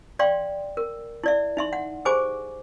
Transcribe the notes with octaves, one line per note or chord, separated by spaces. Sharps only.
D5 F5 G5 C6
A#4
E4 D5 E5
D#4 E5 C6
F#5
G4 G#4 C5 G#5 D6